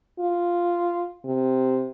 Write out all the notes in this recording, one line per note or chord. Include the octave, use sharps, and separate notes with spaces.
F4
C3